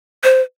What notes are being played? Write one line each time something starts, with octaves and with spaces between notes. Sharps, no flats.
C5